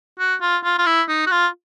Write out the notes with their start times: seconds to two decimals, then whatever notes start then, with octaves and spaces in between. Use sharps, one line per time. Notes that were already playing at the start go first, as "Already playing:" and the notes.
0.19 F#4
0.42 F4
0.64 F4
0.79 F4
0.86 E4
1.08 D#4
1.27 F#4
1.31 F4